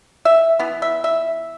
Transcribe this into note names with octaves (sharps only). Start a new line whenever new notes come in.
E5
E3 B3
E5
E5